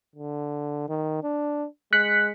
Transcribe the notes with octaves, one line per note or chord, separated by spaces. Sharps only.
D3
D#3
D4
G#3 F#6 B6 C#7